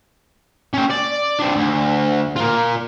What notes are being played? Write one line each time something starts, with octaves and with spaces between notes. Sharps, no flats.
C#4 G5
D5
C4 D4
D2
A#3 F4